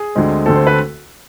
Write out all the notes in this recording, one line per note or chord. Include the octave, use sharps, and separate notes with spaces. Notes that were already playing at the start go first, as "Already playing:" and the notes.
Already playing: G#4
D2 D3 G#3 C4
D2 D3 A3 C4 A4
C5
B4